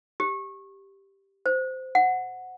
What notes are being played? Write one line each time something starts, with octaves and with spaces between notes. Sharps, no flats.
G4
C5
F#5